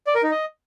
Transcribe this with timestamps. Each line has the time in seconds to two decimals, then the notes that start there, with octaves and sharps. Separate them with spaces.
0.07 D5
0.15 A#4
0.23 D#4
0.31 D#5